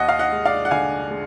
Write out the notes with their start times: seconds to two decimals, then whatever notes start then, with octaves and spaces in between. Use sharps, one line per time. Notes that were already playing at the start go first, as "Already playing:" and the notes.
Already playing: D#2 D#5 F#5
0.09 F5
0.19 D#5 F#5
0.32 G#3
0.45 D5 F5
0.65 F#5
0.71 D3 F5 G#5
1.10 G#3